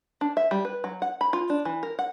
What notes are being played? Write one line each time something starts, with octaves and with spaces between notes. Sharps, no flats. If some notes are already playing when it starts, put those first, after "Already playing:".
D4
E5
G3
B4
F#3
F#5
B5
F4
D4
E3
A#4
F#5